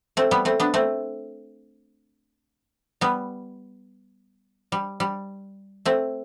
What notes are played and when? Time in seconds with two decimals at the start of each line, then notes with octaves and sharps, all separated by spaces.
0.17 A3 C4
0.31 G3 B3
0.45 A3 C4
0.60 B3 D4
0.74 A3 C4
3.01 G3 B3
4.72 G3
5.00 G3
5.85 A3 C4